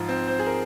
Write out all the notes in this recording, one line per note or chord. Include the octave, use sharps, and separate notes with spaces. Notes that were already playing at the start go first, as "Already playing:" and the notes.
Already playing: G#2 F3
C4
C5
G#4
A#4